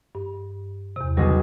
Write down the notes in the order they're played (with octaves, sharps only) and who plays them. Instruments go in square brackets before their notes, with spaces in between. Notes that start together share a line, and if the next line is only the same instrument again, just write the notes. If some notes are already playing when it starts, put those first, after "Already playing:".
[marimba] G2
E2 C3
[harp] B1 C#3 G#4 [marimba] G3